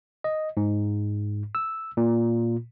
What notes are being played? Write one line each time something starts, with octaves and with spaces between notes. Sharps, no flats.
D#5
G#2
E6
A#2